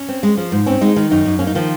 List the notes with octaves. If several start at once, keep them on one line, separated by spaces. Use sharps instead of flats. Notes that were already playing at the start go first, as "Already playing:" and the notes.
Already playing: C#4
C4
G#3
F3
G#2
C4 C#4
G#3 D#4
D#3 D#4
F#2 D#4
F#2
A#3 C#4
D#4
D#3 F3 F4